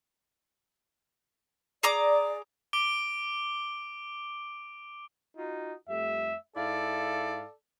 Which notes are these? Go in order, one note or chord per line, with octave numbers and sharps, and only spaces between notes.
G#4 D5 A#5 D6
D6 D7 G7
D#4 F4 F#4
F2 G3 A3 E5
G#2 E4 A4 D5 F5